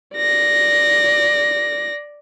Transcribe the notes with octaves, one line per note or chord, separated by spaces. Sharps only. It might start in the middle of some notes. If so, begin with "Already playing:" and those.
D5 A#6